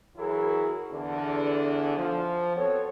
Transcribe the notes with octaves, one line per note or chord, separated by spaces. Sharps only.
E3 F#3 E4 F#4 G#4 A#4
E2 D3
F3
B3 C4 F#4 A4 C#5